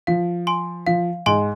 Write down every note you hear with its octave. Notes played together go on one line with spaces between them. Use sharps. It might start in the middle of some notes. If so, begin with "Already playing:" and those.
F3 F5
G#5 C6
F3 F5
G#2 G#5 C6